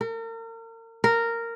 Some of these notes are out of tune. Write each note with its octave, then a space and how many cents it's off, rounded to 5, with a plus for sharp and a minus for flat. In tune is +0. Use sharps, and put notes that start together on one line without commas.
A#4 -40
A#4 -10